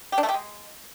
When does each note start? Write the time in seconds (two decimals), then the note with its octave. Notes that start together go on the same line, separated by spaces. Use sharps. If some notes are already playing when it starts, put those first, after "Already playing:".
0.12 G4
0.18 D4
0.23 A3
0.29 G4
0.34 G#3